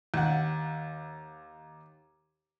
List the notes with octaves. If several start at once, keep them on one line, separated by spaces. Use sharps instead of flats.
D#2 F#5